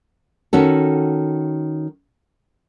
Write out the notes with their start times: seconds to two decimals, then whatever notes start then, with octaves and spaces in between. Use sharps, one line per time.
0.53 D#3 C#4 F#4 A4